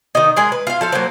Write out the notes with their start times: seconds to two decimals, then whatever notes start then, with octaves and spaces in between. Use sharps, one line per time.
0.15 D#3 D#4
0.36 G#3 G#4 A#4
0.52 B4
0.67 F4 F5
0.81 F3 A4 F5
0.92 F#3 A#3 C4